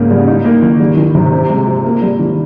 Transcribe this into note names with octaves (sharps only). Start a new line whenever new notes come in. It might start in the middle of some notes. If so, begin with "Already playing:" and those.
Already playing: G#2 C#3 A#3
G3
D#4
A#3
D#3
G3
D#3
C3
C4
G#3
F3
A#3
G3
D#3